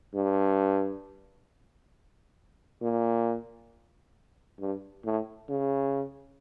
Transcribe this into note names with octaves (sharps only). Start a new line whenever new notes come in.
G2
A#2
G2
A2
C#3